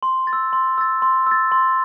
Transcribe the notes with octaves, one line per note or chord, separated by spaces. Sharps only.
C6
A6
E6
C6
E6 A6
C6
E6 A6
C6